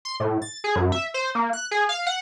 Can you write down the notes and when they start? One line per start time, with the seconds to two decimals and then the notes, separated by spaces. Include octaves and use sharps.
0.05 C6
0.20 A2
0.42 A6
0.64 G#4
0.76 F#2
0.92 E5
1.14 C5
1.35 A#3
1.53 F#6
1.71 G#4
1.89 F5
2.07 F#5